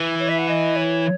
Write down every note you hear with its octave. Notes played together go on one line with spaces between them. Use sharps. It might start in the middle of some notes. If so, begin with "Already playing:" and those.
Already playing: E3
C#5
E5
F#5
D#5
C#5